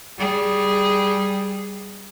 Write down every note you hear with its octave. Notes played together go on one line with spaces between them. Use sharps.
G3 G#4